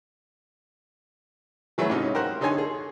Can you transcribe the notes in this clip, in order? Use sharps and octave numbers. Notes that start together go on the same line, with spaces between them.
E3 F#3 A3 G#4 B4 C#5
G#2 C3 C#4 D#4
G4 A#4 C5 F#5
D3 D#4 A4 C#5 G#5 C6
G#4